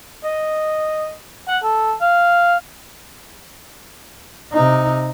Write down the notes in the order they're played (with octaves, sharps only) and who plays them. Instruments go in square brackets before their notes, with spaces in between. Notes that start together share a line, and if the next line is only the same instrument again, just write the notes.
[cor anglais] D#5
F#5
A4
F5
[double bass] C3 D#4